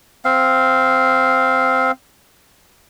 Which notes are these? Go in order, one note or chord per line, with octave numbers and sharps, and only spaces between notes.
C4 F5